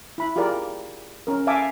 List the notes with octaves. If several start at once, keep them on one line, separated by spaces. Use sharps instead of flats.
E4 B5
F4 G4 G#4 A#4 D5
C#4 A#4
E5 F5 G#5 A5 D6